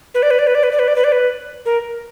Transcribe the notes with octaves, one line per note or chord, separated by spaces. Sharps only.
B4
D5
B4
D5
B4
D5
B4
D5
B4
D5
B4
D5
B4
A#4